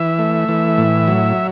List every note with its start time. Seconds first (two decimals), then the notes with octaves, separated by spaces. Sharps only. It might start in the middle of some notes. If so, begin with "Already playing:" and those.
Already playing: E3 E5
0.19 A3
0.49 E3
0.78 A2
1.08 F#3